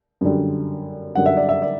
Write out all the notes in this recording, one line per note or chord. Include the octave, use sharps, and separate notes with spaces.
F#2 D3 G3
F#2 D3 G3 F#5
E5
D5
E5
D5